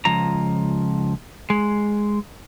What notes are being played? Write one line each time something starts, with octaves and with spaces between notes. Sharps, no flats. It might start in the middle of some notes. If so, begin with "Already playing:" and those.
C#2 F3 A#5
G#3